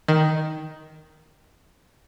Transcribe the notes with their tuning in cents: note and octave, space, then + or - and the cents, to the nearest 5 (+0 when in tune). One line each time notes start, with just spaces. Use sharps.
D#3 +5